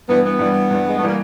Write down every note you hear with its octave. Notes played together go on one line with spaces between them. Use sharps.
G2 E3 G3 B3
B3
G2 E3 G3
G2 E3 G3
G#3
A3
E3 G3 A#3